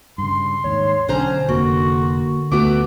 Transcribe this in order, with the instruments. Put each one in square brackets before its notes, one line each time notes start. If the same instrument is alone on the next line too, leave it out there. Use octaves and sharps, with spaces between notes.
[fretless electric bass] G2 C#3 [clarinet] C6
[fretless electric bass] D#2 G#2 [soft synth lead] C#5
[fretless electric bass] B1 [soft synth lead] D3 [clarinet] C#4 [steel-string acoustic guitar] D4 C5 A#5
[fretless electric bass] F1 [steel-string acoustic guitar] A#3 [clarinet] F#4
[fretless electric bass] D2 [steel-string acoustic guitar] A3 B3 F#4 [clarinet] D6